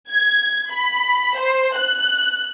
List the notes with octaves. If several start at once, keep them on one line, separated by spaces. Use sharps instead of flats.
G#6
B5
C5
F#6